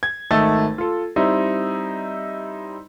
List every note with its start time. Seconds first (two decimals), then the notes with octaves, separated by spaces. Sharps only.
0.03 G#6
0.31 G#1 D#3 A3 D#5 E6 A6
0.78 F4 A4
1.16 G3 C4 D#4 E4 D#5